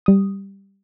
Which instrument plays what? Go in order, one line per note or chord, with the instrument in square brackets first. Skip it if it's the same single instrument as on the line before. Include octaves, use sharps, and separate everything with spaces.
[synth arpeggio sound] G3 D#6